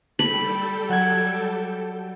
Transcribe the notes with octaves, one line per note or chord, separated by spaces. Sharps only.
G3 A4 G5 B5
F#3 F#5 G#6